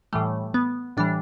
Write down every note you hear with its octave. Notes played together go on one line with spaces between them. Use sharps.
A2 E3 G3 A3
B3
A2 E3 G3 D4